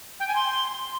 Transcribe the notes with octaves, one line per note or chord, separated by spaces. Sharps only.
G5
G#5
C6